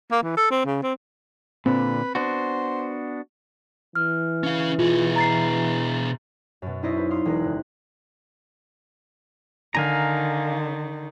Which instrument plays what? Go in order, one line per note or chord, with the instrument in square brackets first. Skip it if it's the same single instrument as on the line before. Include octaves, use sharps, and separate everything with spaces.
[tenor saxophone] A#3
E3
A4
C4
C#3
C4
[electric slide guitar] A#2 D3 [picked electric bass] C4 [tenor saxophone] B4
[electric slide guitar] B3 D4 F#4 [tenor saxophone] C5
[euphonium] E3 [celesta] F6
[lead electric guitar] C#4 F5
[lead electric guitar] B2 G#4 [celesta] F4
[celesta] A#5 A6 C7
[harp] F#2 B2
C#4 D#4 E4 C5 D5 D#5
B4
F5 C6 D#6
E1 G#3 F#6
F#1
[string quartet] D3 D#3 [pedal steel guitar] F5 G#5 A#5